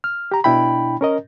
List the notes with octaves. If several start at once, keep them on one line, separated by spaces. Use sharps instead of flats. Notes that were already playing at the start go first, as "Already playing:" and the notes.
F6
G4 A#5
B2 D4 E4 G5 B5
C#4 A#4 D#5